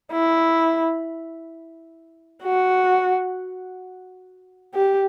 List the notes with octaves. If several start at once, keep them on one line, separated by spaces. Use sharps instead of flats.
E4
F#4
G4